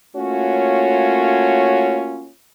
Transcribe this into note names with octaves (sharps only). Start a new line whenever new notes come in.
A3 A#3 C#4 F4 F#4 C#5